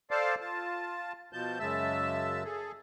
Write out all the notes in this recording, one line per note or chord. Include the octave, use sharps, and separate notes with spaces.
A4 C5 D5 F5 A5
F4 A5
B2 F3 A5 G6
F#2 C#3 G#3 E5 A5 E6
G#4 A4